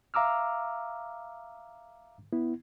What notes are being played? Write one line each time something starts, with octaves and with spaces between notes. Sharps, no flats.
E5 F5 A#5 D6 E6 F6
B3 E4